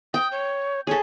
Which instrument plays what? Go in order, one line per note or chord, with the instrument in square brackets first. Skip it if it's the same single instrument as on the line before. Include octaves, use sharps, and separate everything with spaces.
[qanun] G5 [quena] D#6
[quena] C#5
[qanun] G#4 A4 [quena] C#5